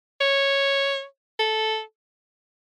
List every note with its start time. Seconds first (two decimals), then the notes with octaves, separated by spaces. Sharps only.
0.21 C#5
1.39 A4